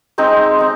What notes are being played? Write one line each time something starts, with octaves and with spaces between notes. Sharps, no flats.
G#3 C4 D#4
G#3 C4